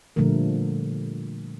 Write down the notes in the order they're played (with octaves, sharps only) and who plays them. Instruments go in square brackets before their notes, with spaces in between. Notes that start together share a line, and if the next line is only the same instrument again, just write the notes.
[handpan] A#2 D3 F3 G3 A3 A#4